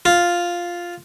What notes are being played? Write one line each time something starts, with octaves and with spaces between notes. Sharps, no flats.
F4